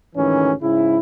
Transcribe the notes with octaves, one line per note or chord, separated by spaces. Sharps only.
D2 G#2 D#3 E3 C#4
G#2 C#3 E4